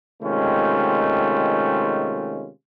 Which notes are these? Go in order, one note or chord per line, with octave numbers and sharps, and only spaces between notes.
C3 D#3 G#3 A3 C#4 F4